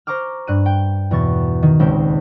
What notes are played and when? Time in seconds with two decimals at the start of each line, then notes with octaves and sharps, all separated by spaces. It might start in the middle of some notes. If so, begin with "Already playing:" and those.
0.07 C5 A#5 C#6 D6 F6
0.47 G2 F#6 D#7
0.66 G5
1.11 E2 B2 C#6 A6
1.63 D#3
1.79 D#1 C#2 G#3 C4 G5